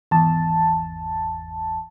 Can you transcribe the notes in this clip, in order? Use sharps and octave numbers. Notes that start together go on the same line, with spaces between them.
G#1 E2 A5